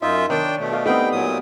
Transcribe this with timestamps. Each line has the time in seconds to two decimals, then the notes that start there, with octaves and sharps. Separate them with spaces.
0.02 F#2 D#4 F4 E5
0.30 D#3 D4 C#5 D5 G5
0.59 B2 A3
0.72 D5 D#5 F5
0.86 G3 A3 B3 C4 D#4 G5
1.12 A#2 F#3 D#6